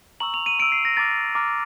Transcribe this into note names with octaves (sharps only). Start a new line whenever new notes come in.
A#5 C#6 E6 F#7
F7
D#7
A#5 C#6 E6 D7
C7
A#6
A#5 D6 F6 A6
A#5 D6 F6